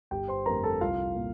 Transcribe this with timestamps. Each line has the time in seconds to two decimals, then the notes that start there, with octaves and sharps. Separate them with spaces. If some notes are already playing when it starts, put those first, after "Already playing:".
0.11 G1 G4 G5
0.28 C5 C6
0.46 F2 D3 A3 A#4 A#5
0.63 A4 A5
0.81 C2 F4 F5
1.15 A#2